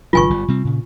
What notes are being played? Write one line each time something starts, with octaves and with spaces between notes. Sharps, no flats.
G#1 C#3 F#3 F4 G#5 C#6
G1 G3
C3 G3 C4
A#2 C#3